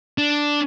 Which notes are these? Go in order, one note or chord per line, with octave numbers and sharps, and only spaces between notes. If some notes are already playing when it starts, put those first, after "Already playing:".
D4